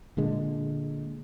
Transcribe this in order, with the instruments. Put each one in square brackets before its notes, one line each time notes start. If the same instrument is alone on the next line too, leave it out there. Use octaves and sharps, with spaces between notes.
[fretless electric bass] A#2 D3 G#3